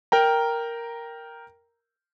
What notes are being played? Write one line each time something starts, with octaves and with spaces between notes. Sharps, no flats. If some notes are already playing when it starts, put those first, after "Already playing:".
A#4 G5 A#5